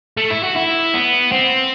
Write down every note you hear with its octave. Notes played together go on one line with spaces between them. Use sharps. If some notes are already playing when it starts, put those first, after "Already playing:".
A3
E4
F#4
E4
B3
C4